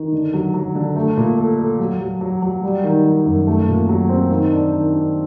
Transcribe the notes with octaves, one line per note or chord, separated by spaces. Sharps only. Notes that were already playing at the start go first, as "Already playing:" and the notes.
Already playing: D#3
D3
F#3
F#3
D3
A3
A#2
A4
A4
F#3
F#3
F#3
F#3
G3
D#3
D#3
F#2
A3
A#2
F#3
C4
D#3
D4
D#3
D4